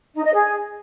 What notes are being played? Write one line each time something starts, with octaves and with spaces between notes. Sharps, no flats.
D#4
D#5
G#4